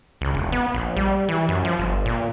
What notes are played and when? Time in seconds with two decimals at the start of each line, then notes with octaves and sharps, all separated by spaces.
0.21 C#2
0.35 E1
0.52 B3
0.74 A#1
0.96 G3
1.29 E3
1.49 F#2
1.65 F3
1.78 G1
2.06 A#2